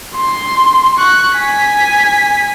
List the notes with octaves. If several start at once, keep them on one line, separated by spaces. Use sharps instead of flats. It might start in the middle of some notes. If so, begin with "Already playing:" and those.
C6
C#6 F#6
G#5 B6